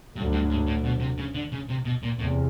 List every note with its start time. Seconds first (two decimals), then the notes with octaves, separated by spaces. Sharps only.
0.16 D2 G2 D3 F#3
0.32 G2
0.50 G#2
0.67 A2
0.84 B2
1.00 C3
1.18 C#3
1.34 D3
1.52 C#3
1.69 C3
1.85 B2
2.03 A#2
2.19 E2 A2 C3